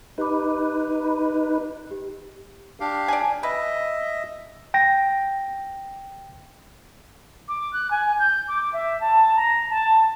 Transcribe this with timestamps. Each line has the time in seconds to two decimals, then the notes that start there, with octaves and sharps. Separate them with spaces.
0.18 D#4 G4 B4 B5 D6
1.91 G4
2.80 D4 G4 F5
3.08 D5 G#5
3.43 B4 D#5 E5
4.74 G5 A#6
7.48 D6
7.73 F#6
7.90 G#5
8.19 G6
8.48 D6
8.73 E5
9.00 A5
9.36 A#5
9.70 A5